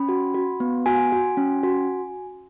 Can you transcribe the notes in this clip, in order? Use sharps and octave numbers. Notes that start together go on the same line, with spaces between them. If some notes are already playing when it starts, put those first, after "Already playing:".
Already playing: C#4 B5
F#4
F#4
B3
F#4 G#5
F#4
C#4
F#4